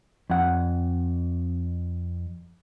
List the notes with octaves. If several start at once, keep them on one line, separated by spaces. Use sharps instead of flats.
F2 F#5